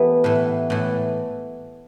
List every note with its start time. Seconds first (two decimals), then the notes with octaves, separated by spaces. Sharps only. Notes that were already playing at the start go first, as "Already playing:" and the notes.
Already playing: E3 A3 B3 G4
0.24 A2 E3
0.70 A2 E3